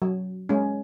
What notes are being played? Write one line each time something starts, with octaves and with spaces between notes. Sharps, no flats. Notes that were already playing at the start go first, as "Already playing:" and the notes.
F#3
G#3 C#4